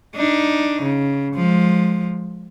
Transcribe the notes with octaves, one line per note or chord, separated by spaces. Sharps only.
D4 D#4
C#3
F3 G#3